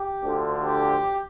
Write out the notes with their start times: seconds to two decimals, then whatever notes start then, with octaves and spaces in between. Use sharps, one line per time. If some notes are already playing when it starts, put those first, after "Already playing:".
Already playing: G4
0.24 D2 D3 F3
0.63 G4